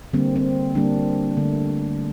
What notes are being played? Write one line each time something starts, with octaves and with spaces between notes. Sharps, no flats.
D3 G3 A#3 C4
C4
D3 G3 A#3 D4
D3 A3 C4